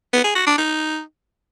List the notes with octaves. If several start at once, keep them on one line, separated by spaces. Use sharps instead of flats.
B3
G#4
F#4
D4
D#4